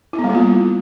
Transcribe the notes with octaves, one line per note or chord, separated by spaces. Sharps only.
E4
B3
G3
A#3
F4